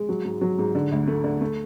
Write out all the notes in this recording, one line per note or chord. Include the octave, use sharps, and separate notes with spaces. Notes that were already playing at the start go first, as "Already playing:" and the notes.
Already playing: G#3
F#3
G#2
F#3
G#2
D3
D2
A3
D3
A3